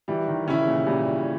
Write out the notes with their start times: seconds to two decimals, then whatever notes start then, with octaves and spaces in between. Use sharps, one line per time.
0.08 E3 G3
0.28 D#3
0.48 C#3 C#4 E4
0.67 A#2
0.86 A#2 G3